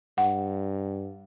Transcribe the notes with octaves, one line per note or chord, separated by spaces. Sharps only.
G2 F#5